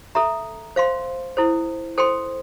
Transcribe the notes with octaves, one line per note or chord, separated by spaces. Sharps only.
A4 E5 A#5
C5 F5 C6
E4 A4 C5
A4 C5 G5 C6